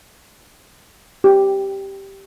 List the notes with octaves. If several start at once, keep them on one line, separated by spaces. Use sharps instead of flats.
G4